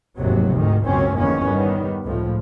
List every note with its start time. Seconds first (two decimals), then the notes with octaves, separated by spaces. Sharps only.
0.18 F1 D#2 G#2 C3 F#3
0.54 D2 G#2 D#3
0.86 F#1 C#2 F#2 B2 C4 C#4
1.17 G1 E2 D#3 F3 A#3 C#4
1.47 D#3 G3 B3
2.04 C#2 A2 F3